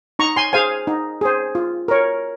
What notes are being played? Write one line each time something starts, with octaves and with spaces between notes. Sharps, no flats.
D#4 A#5 C#6
G#5 C6
G#4 C5 F5 G#5
D#4
G#4 C5
F4
A#4 C#5